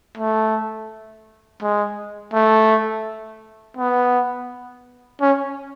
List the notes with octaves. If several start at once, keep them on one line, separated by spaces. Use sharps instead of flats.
A3
G#3
A3
B3
C#4